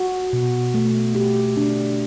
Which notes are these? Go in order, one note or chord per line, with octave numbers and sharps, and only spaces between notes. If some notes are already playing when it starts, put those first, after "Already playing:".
Already playing: F#4
B2
A3
G4
D4